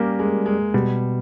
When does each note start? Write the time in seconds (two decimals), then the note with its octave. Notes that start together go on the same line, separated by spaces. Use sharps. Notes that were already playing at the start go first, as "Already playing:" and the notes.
Already playing: G3 A#3 C#4 G4 A#4
0.19 G#3
0.46 G#3
0.74 B2 G3